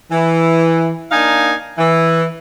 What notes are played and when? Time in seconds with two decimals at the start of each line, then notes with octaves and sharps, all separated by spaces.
0.11 E3
1.12 A#3 D4 D#4 F5 G#5
1.78 E3